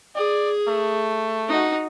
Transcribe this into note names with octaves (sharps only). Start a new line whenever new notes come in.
G#4 D5
A3
D#4 F#4